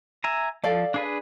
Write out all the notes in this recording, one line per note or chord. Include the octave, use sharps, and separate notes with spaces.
E5 G#5 A#5
F3 A4 D5 F5
D4 G#4 B4